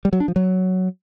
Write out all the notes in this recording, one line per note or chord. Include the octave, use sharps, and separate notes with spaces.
G3
F#3
D4
F3
F#3